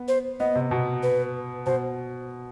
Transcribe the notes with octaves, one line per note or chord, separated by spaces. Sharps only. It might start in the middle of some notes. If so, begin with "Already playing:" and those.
Already playing: B3
C5
B3 D#5
C3
B2
B4
B2 C5